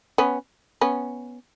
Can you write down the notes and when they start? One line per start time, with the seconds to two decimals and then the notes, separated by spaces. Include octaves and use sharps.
0.18 B3 C#4
0.81 B3 C#4